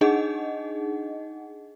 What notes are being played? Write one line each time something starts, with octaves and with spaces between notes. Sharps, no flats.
D4 D#4 G#4 D#5 F#5